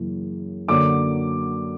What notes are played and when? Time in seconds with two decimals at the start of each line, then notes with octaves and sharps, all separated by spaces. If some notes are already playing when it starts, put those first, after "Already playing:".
Already playing: F#2 C#3 E3 A#3
0.68 F#2 D3 F#3 A#3 D6